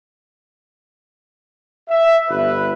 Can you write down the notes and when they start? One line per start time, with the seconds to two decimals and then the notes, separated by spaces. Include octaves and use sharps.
1.89 E5
2.28 G1 B4